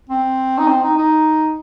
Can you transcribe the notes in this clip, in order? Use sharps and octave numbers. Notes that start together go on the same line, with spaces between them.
C4
D#4
C4
D#4
D#4